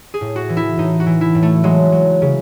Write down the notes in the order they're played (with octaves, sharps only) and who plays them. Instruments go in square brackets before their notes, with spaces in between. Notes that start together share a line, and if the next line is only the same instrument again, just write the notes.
[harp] G#4
A2
F#4
E3
E4
A2 D#4
F#4
E3
E4
A2
A3
F#3 G#3
F#3
C#3